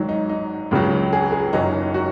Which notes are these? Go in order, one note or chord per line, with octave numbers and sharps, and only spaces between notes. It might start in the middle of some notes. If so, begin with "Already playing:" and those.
Already playing: G#1 G#2 D#3 F#3
D#4
D#4
C#2 C#3 F#3
G#4
G#4
F#1 F#2 F#3 D#4
F#4